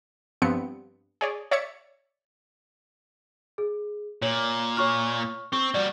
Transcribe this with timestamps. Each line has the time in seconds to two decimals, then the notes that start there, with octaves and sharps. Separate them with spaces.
0.42 G2 F3 B3 C4 C#7
1.21 G#4 C#5 D5
1.51 C#5 D5 E5 G#6 A6 C#7
3.58 G#4
4.22 A#2 C#5 F#7
4.77 C#5 C#6 F6
5.53 C4 C#6 G7
5.74 G3 F#4 D5